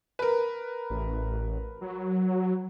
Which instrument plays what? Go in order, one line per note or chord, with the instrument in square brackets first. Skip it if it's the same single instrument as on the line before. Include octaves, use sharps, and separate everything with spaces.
[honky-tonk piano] A#4 B4
[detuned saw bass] A1
F#3